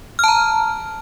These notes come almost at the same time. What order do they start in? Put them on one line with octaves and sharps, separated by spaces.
F6 A5 A#5